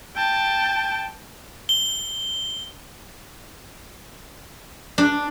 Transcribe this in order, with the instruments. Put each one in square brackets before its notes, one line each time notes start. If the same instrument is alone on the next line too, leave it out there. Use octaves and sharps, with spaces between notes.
[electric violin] G5 A5
[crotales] G7
[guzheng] D4